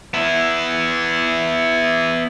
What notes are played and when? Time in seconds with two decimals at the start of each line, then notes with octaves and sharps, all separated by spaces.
0.14 B3 E4